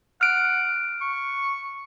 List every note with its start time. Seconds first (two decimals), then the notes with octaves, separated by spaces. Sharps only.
0.21 F#5 F6 D7
1.02 C#6